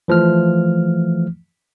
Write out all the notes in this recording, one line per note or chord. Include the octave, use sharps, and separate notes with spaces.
E3 F3 A3 F6